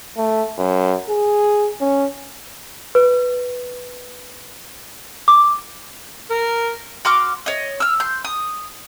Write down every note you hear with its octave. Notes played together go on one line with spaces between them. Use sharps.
A3
F#2
G#4
C#4
B4
D6
A#4
F#4 C6 D6 F6
C#5 D#5
E6 F6
C6 G6
D#6